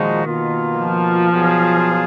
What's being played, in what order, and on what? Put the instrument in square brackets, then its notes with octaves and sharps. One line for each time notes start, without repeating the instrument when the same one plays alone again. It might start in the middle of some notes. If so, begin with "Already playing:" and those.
Already playing: [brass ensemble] A#2 F3 G#3 D#4 F#4 [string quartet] D#3
[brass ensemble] B2 A#3 F4
[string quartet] F3
[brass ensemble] B2 F#3 B3 F4 G#4